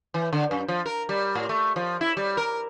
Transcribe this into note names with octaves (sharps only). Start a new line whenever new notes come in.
E3
D3
F#2
F3
A#4
G3
A2
A3
F3
E4
G3
A#4